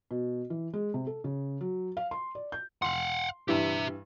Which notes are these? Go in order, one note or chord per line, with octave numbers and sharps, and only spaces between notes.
B2
E3
G#3
C3
A4
C#3
F#3
F5
C6
D5
G6
F5 F#5 C6
G2 E3 G4 E5